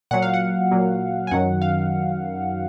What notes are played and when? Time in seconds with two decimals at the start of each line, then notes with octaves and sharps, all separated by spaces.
0.11 A#2 F#3 F#5
0.22 F5
0.34 F#5
0.71 A#2 F#3
1.27 G#5
1.31 F#2 D#3 F#3 F#5
1.62 F5